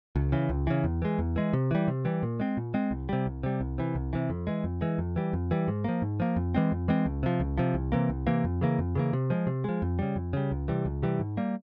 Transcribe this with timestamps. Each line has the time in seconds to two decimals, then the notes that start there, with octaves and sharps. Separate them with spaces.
0.16 C#2
0.32 C#3 E3
0.49 C#2
0.67 C#3 E3
0.84 E2
1.02 E3 G#3
1.19 E2
1.36 E3 G#3
1.53 C3
1.71 E3 G3
1.88 C3
2.05 E3 G3
2.23 A#2
2.40 G#3 C4
2.57 A#2
2.74 G#3 C4
2.91 C2
3.09 C3 G3
3.26 C2
3.43 C3 G3
3.60 C2
3.78 C3 E3
3.95 C2
4.13 C3 E3
4.30 F2
4.47 E3 G#3
4.64 F2
4.81 E3 G#3
4.98 F2
5.16 E3 G3
5.33 F2
5.51 E3 G3
5.68 G#2
5.84 F3 A#3
6.02 G#2
6.20 F3 A#3
6.36 F2
6.55 E3 G#3 C4
6.72 F2
6.88 E3 G#3 C4
7.06 C#2
7.23 C3 F3
7.40 C#2
7.58 C3 F3
7.74 C2
7.92 C3 E3 A#3
8.09 C2
8.27 C3 E3 A#3
8.44 F2
8.61 C#3 E3 A#3
8.79 F2
8.95 C#3 E3 A#3
9.13 C3
9.30 F3 G#3
9.47 C3
9.64 F3 G#3
9.82 F2
9.99 C#3 G3
10.16 F2
10.33 C#3 G3
10.51 C#2
10.68 C3 E3 G3
10.85 C#2
11.03 C3 E3 G3
11.20 G#2
11.37 G3 A#3